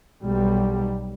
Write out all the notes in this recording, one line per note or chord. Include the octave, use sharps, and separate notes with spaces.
B1 G3